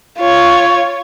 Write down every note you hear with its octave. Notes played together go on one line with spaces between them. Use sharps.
F4 C#5